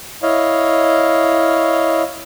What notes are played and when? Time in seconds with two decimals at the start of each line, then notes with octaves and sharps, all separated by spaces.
0.22 E4 C#5 D#5 F5